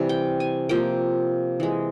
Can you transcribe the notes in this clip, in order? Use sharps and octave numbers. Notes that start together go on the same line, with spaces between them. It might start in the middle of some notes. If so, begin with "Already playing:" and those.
Already playing: C3 E3 G3
G5
G#5
C3 F3 A#3 G5
E3 G#3